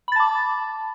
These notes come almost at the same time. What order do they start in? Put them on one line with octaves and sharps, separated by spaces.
B5 A6 A5 D6